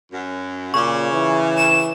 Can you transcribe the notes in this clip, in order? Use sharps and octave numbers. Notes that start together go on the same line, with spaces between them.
F#2
A#2 C#3 C#6 D6
E3
E7